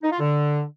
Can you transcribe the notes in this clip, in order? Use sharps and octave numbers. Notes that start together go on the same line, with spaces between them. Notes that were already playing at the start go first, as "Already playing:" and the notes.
D#4
F4
D3